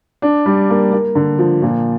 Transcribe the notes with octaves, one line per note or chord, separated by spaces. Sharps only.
D4
G3
A#3
A#3
D3
F3
A#2